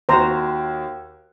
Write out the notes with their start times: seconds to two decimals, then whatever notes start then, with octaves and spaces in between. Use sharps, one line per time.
0.09 D#2 F#4 C5 A#5